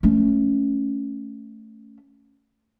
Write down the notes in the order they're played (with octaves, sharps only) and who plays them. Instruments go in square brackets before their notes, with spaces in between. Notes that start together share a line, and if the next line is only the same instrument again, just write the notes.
[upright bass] A3 C#4